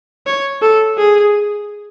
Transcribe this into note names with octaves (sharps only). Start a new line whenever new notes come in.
C#5
A4
G#4